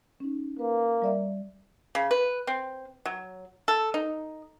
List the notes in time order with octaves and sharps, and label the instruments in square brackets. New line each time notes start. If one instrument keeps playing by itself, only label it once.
[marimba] C#4 D#4
[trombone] A#3 [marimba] B4
[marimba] G3 D5 E5
[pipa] C#3
B4
C4
F#3
A4
D#4